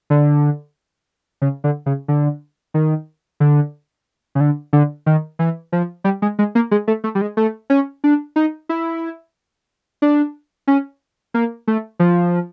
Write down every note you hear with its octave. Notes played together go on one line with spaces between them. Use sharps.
D3
C#3
D3
C#3
D3
D#3
D3
C#3
D3
D3
D#3
E3
F3
G3
G#3
G#3
A#3
G#3
A3
A3
G3
G#3
A3
C#4
D4
D#4
E4
D4
C#4
A#3
A3
F3